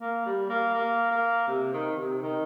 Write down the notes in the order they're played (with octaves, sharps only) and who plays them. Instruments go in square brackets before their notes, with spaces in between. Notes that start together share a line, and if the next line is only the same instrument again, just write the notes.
[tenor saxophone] A#3
G3
A#3
A#3
A#3
C3
D#3
C3
D#3